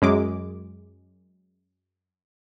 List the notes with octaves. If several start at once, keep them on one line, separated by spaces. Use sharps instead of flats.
F#2 G#3 D6